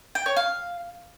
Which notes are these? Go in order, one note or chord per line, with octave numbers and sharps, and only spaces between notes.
G5
C#5
F5